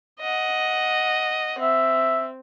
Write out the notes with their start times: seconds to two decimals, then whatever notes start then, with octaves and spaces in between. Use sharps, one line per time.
0.20 D#5 F#5
1.61 C4 E5